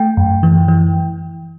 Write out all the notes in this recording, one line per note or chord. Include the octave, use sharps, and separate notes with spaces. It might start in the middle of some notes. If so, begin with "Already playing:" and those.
Already playing: A3 G5
F#2
E3
E3